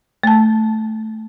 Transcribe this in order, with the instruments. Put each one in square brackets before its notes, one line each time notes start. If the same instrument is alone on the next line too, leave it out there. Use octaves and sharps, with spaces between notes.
[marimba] A3 A5